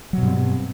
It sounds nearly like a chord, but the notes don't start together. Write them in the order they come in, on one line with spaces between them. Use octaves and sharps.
F#3 B2 G2 C4